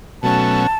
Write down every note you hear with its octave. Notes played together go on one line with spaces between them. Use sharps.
B2 F#3 A3 C#4 A5